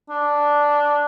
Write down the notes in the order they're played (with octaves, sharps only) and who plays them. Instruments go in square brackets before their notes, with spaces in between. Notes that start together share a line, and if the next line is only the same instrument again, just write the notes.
[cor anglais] D4